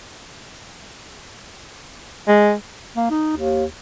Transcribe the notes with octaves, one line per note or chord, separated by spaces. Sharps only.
G#3
A#3
D#4
D#2